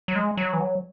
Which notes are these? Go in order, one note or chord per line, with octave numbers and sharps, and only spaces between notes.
F#3
G#3
F#3
E3
F#3